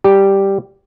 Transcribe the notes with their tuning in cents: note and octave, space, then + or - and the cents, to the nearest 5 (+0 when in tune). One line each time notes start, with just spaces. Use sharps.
G3 +0 G4 +0 A#5 -40